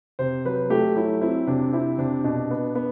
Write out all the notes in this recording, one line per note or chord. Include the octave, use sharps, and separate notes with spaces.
C3 C5
F#3 B4
A3 G4
F#3 E4
C4 E4
C3 D4
C4 E4
C3 D4
B2 D4
B3
B3